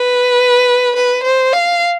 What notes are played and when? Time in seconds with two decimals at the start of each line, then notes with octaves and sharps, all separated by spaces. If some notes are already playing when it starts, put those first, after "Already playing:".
Already playing: B4
0.96 B4
1.24 C5
1.53 F5